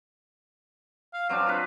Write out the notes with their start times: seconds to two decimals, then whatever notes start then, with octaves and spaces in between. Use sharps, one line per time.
1.14 F5
1.29 F#3 C4 D4 F5
1.46 F4 B4